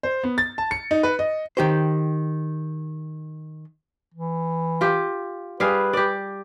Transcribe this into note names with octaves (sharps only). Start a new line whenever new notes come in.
C5
B3
A6
A5
C#7
D#4
B4
D#5
D#3 G4 C5
E3
F4 G4
G3 G#4 B4 F5
G4 D5